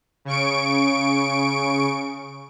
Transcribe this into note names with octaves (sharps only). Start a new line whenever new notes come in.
C#3 C#6 D7